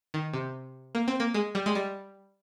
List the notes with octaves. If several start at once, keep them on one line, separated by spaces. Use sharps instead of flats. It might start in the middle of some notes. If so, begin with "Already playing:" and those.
D#3
C3
A#3
C4
A#3
G#3
G3
G#3
G3